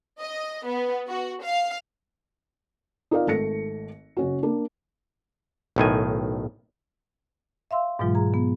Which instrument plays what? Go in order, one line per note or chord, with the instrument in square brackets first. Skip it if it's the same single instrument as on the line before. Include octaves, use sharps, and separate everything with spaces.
[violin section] D#5
B3
F#4
F5
[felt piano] D#4 F4 A#4 D5 F5
G#1 A3 A#6 C#7
F#1 C#4 F#4
A#3 D4
[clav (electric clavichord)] B1 A2 D#3 G#5
[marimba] E5 F5 C6 E6
G#2 B2 E3 F#3 G#3 F4
G#4 A#5
B3